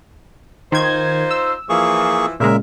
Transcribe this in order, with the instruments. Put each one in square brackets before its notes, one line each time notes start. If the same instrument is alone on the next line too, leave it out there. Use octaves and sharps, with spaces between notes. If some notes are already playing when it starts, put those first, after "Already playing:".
[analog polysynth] D#3 G#6 [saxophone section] D#4 F4 C5
[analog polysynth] E6
[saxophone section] E3 F3 [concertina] A#3 G#4 C#6
[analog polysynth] A#2 C#3 G#3 [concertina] A#4 E5